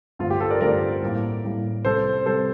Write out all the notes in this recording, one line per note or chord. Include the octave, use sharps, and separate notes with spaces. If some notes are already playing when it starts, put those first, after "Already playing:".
G2 D3 A3 C4 F4
G4
F4 A4
A#4 D5
G2 D3 A3 C4 A#4 D5
A2 G3 A#3
A2 G3 A#3
C3 G3 C4 A4 C5
C3 G3 C4 A4 C5